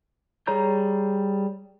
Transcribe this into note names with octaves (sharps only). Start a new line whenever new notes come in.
G3 G#4 C#5 A#5 G6